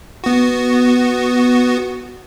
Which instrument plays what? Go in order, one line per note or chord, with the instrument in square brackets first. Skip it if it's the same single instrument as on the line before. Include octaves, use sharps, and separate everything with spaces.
[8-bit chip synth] B3 F#4